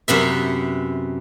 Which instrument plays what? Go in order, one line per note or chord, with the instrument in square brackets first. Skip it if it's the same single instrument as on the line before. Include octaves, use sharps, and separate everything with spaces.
[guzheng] F#2 C3 B3 E5